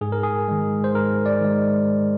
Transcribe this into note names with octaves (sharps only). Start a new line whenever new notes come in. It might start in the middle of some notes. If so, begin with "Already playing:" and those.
G#2 G#4
A#4
G#4
D#3 G#3
C5
G#2 A#4
D5
D#3 G#3